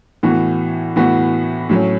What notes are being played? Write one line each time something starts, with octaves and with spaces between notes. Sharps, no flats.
A2 E3 B3 F#4
A2 E3 B3 F#4
A2 F#3 C#4